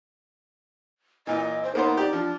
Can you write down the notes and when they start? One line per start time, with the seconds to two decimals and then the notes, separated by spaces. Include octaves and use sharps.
1.27 A#2 E3 D#5
1.63 C5
1.75 A#3 B3 D#4 C5
1.97 G4 D5
2.13 F3 D4